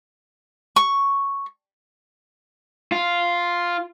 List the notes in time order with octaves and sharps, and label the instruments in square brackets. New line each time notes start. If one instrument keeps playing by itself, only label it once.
[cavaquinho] C#6
[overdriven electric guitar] F4